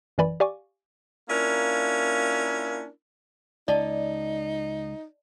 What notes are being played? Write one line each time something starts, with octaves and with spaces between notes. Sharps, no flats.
A1 F#2 E3 D5 G#5 B5
G4 D5 F5 G#5 C#6 D6
A#3 C#4 D4 E4 F4 A#4
C#2 D#4 D5 D#5 A5